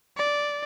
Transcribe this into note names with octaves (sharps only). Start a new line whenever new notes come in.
D5